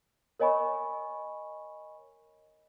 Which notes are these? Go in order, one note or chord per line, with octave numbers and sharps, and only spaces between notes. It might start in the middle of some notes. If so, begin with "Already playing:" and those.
A#4 C#5 D#5 G#5 B5 C#6